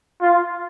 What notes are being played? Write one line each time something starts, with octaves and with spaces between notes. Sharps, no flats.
F4